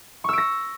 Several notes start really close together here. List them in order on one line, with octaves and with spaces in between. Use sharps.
C#6 E6 D7 A#6